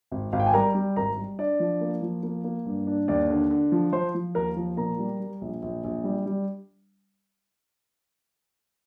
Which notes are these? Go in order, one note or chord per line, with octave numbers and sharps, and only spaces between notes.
G#1
G#1 F5
G5
G#5
G3 A#4 A#5
G3
G#1 A#4 A#5
G3
D4 D5
F3
A#3
F3
A#3
A#3
G2
D4
D#2 D5
D3
D3
F3
F3 C5 C6
F3
D#2 A#4 A#5
F3
A#2 A#4 A#5
G3
G3
A#1
A#1
A#1
G3
G3